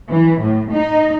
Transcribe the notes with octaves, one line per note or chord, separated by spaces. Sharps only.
E3
A2
D#4